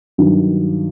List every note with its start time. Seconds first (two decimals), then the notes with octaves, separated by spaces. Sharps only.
0.18 G2 D#3 F#3